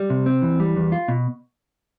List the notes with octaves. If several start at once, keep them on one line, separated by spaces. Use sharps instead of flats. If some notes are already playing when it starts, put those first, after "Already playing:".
Already playing: G3
C3
C4
E3
G3
E2
F4
B2